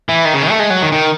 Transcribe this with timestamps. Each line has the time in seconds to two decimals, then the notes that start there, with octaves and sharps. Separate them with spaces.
0.09 E3
0.25 D#3
0.33 C#3
0.42 D#3
0.50 A3
0.59 G#3
0.70 F#3
0.82 D#3
0.92 D#3